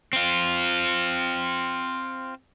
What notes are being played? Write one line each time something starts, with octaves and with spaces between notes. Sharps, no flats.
C4 F4